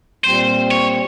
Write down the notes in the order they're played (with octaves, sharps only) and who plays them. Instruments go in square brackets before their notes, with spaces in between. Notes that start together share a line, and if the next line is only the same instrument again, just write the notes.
[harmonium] A#2 G3 C4 [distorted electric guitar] C5
[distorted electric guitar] C#5